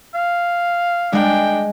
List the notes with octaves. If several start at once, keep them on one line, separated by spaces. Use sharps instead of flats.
F5
G#3 D4 G5